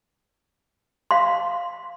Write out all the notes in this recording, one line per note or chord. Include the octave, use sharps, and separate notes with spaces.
F5 C6